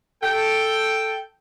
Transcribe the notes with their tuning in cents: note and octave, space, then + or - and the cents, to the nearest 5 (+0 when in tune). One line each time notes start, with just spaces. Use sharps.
A4 +0 G5 +0